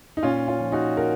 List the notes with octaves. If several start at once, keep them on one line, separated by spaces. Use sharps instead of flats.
D#4
A#2 C#4 F4
C#4 F4
F3
D#4 F#4
F#4 A#4